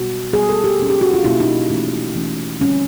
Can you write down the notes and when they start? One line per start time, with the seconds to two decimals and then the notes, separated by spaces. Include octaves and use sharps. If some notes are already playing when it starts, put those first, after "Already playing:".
Already playing: B2 G3 B3 F#4
0.33 B2 G3 B3 G#4
0.49 A4
0.64 G4
0.79 B2 F#3 A#3 C#4
0.90 G4
1.01 F#4
1.13 F4
1.24 B2 F#3 A#3 C#4 E4
1.40 D#4
1.70 E3 A3 C#4
2.15 E3 A3 C#4
2.61 D3 G3 C4 C#4